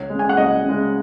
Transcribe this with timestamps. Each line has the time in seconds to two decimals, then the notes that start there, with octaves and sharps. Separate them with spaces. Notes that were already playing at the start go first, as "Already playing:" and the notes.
Already playing: C#2 C#5
0.10 C#3 G#3
0.19 G#5
0.29 F#5
0.37 C#2 D#5
0.65 C#3 G#3